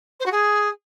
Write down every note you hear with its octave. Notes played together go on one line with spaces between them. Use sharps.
C5
F#4
G#4